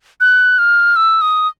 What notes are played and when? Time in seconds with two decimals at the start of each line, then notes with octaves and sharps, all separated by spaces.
0.20 F#6
0.59 F6
0.96 E6
1.21 D#6